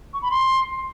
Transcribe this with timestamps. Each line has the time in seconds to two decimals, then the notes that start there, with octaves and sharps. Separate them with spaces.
0.13 C#6
0.22 B5
0.31 C6